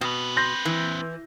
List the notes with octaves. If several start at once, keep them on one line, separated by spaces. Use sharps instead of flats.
B2 C4 B4
C6 G6 A#6
E3